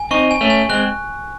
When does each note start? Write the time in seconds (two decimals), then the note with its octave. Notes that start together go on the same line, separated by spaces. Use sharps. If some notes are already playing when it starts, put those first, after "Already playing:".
Already playing: G#5
0.11 C4 D#4 C#6
0.31 G#5
0.41 A3 C#4
0.50 G#5
0.69 G#3 C4 F#6